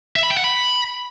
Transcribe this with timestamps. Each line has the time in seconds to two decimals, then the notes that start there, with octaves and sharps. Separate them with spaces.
0.16 E5
0.23 B5
0.30 G5
0.37 F#5
0.44 B5